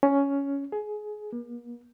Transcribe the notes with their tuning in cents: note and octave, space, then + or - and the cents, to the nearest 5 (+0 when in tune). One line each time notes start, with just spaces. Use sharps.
C#4 +10
G#4 +20
A#3 +45